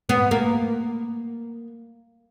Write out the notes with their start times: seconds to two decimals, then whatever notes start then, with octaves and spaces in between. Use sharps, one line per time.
0.09 B3
0.31 A#3